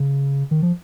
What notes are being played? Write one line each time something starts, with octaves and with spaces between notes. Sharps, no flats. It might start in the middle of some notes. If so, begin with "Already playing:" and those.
Already playing: C#3
D#3
F3